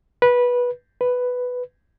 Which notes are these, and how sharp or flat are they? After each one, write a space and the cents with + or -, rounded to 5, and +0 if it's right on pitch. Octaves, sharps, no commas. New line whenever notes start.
B4 -15
B4 +5